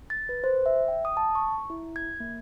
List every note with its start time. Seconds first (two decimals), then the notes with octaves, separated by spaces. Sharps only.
0.10 A6
0.29 B4
0.44 C5
0.66 E5
0.88 G5
1.05 D#6
1.17 A5
1.35 C#6
1.70 E4
1.96 G#6
2.20 A#3